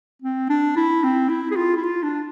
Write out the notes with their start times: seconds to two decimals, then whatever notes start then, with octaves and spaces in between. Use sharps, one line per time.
0.22 C4
0.50 D4
0.76 E4
1.04 C4
1.29 E4
1.51 G#4
1.56 F4
1.77 E4
1.83 F4
2.03 D4